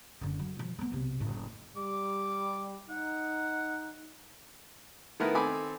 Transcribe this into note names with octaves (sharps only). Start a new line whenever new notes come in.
F#1 D3
F#3
B2 F3
A3 B3
B1 C3
F#1 A2
G3 D6
D#4 F#5
D#3 A3 B3 E4 A#4 B4
D#3 C4 A4 G#5 B5 D6